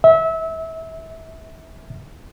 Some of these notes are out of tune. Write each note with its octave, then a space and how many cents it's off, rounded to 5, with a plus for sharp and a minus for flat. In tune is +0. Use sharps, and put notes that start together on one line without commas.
E5 -25